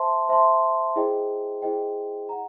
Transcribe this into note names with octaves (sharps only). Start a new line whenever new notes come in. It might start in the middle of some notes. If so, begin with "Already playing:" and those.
Already playing: C5 E5 A5 C6
C5 E5 A5 C6
E4 G#4 C5 D#5 G5
E4 G#4 C5 D#5 G5
F#5 A#5